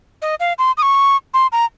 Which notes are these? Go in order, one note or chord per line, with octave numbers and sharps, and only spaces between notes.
D#5
F5
C6
D#6
C#6
C6
A#5